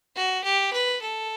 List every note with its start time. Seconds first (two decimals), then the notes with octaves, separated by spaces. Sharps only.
0.16 F#4
0.44 G4
0.73 B4
1.02 A4